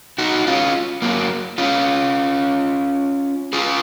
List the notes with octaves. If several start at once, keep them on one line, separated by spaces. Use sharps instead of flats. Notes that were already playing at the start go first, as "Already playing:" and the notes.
D#4 F#4
C#4 F4
F#3 A#3
C#4 F4
F4 G#4